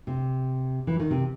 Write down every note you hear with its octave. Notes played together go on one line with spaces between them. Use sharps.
C3
E3
D#3
C3